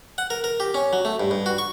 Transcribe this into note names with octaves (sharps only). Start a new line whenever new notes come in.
F#5
A#4
A#4
G4
C#4
F#3
A3
G2
G2
F#4
C#6